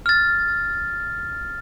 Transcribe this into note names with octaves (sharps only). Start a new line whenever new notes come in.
F6 A6